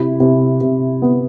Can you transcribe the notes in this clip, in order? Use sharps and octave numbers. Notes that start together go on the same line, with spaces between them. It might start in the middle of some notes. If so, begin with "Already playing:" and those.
Already playing: C3 E4
C3
C3
B3